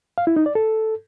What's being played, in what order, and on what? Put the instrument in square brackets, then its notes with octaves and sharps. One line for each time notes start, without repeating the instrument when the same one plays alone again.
[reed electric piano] F5
E4
D#4
D5
A4